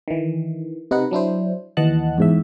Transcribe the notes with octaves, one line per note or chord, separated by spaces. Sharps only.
D#3 E3
C3 D#4 B4 D#5 F#5
F#3 D4 E4 C5
D#2 E3 D#5 F#5 A5 F#6
E2 G#2 E5